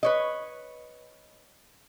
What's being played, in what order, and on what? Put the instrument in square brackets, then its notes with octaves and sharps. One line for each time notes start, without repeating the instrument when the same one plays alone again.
[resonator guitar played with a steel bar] B4 C#5 D#5